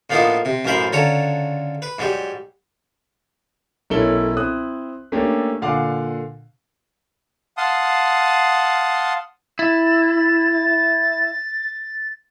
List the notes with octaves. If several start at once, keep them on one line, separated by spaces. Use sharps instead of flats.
A2 F3 A#3 B3 D4 D#4
C3
A1 F#2 A2 A#4 C5 B5
C#2 D3 A4 C#5 A#5
B4
G#2 F#3 G3
B1 C#4 E4 A4 A#4 G7
C4 E4 D#6 F#6
A3 A#3 C#4 D4 G4 A4
A#2 D3 F5 F#5 G#5 D6
F5 F#5 A5 C6 D#6
E4 A6